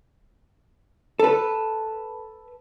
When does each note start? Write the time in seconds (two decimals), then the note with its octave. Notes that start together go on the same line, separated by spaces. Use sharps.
1.20 A4 B4